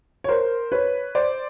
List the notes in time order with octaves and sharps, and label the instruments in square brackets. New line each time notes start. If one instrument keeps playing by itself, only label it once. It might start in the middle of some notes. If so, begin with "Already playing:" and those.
[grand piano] C#5
A#4 C5
B4 C#5
C5 D5